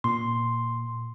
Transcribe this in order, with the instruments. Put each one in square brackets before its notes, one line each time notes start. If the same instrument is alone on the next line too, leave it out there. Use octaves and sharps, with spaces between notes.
[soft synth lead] A#2 [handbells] C6